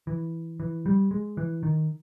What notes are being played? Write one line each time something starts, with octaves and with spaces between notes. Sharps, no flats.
E3
E3
G3
G#3
E3
D#3